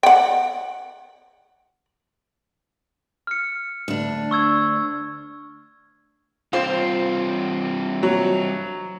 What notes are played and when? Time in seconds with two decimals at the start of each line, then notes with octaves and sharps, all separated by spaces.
0.03 F#5 G5
3.27 F6 C#7
3.88 D2 D4
4.31 C#6 E6 G#6
6.53 G2 C4 F4 C5
8.03 F#3